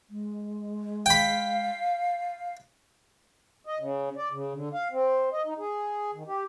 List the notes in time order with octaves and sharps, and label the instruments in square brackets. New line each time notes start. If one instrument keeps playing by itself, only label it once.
[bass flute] G#3
[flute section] F5 [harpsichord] G5 B5
[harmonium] D#5
C#3
D5
C#3
D3
F5
C4
D#5
D#4
G#4
D#3
G4